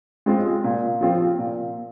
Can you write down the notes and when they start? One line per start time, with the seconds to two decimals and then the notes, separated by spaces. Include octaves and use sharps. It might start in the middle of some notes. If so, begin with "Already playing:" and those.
0.26 G#3 C4 F4
0.64 A#2
1.01 F3 C4 F4
1.39 A#2